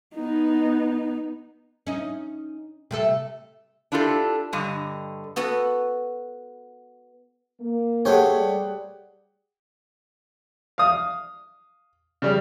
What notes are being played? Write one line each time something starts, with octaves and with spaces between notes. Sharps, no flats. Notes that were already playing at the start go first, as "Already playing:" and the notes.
B3 D#4
C#4 D#4
C3 A3 A4
D4 E4 F4 G4 A4
G2 D3 G3 D#5
B3 F#4 A4 B4
A#3
A3 G4 G#4 C5 C#5 F#5
G3 D5
F5 D#6
C#3 G3